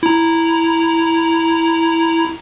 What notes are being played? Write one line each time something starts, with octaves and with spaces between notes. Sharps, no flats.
E4 A#5